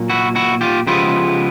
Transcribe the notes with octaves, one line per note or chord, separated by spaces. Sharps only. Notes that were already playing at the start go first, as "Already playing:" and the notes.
Already playing: A#2 F#3 A#3
E4 F#4
E4 F#4
F4 G4
C#3 F3 G#3 B3 E4 F4 G4